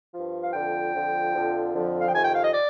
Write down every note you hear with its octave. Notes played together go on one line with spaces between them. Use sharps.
G2 F3
F5
F2 D3 F3 G5
F2 D3 F3
F2 D3 F3
F2 D3 F3
F5
G5
F2 C3 D#3 G#5
G5
F5
D#5
D5